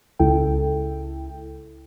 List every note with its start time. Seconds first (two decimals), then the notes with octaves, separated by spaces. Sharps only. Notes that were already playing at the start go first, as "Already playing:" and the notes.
0.19 C#2 C#3 E4 A4 G5